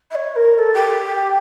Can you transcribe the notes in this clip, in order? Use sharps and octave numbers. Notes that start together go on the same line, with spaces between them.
E5
C#5
C#5
A#4
A#4
A4
G4